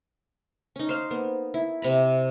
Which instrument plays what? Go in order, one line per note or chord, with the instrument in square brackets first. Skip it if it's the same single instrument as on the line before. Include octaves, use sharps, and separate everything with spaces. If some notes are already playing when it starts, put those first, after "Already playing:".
[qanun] C#4 D#4
C5 F5
A#3 B3
E4
C3 A#5 B5